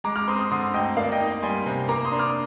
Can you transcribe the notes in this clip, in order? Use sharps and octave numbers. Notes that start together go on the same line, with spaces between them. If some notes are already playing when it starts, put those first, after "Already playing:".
G#3 A#5 D6
D6 F6
C4 C6 D#6
C6 D#6
D3 C6 D#6
D2 D#5 G5
A#3 D5 F5
D#5 G5
D#4
G3 G#5 C6
C3
A#3 A#5 D6
C6 D#6
D4
D6 F6